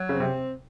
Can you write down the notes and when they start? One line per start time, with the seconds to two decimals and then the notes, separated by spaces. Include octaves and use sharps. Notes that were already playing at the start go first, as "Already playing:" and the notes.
Already playing: F#3
0.09 C#3 C4
0.20 C3